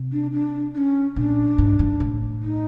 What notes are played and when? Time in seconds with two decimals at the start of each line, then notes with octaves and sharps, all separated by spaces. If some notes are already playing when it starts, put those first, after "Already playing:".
Already playing: C3
0.12 D4
0.33 D4
0.74 D4
0.78 C#4
1.16 A#2 D4
1.58 G#2
1.79 G2
2.00 A2
2.42 D#4